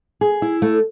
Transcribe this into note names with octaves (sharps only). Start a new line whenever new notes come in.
G#4
E4
A3